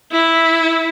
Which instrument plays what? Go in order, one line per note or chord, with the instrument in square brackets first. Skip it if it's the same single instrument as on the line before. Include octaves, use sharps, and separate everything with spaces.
[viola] E4